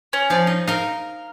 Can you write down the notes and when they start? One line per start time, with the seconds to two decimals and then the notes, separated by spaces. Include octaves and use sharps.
0.13 C#4
0.30 F3 D5 F5
0.47 D#4
0.68 D#4 A#4 F5